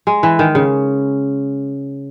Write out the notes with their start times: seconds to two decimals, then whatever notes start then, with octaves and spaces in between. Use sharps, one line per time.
0.07 G#3
0.23 E3
0.39 D#3
0.55 C#3